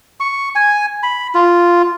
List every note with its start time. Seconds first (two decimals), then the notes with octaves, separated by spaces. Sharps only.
0.20 C#6
0.55 G#5
1.03 B5
1.35 F4